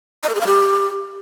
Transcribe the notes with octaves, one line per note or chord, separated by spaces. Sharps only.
D#5
A#4
G#4
F5
G4